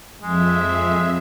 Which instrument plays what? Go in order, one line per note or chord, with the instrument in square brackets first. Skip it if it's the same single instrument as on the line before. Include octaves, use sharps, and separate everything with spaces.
[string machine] F2 E5 [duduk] F3 [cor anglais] G#3